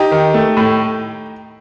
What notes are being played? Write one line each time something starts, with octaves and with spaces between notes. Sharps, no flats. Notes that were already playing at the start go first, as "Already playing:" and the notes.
Already playing: D#4 G4
D#3
A3
A2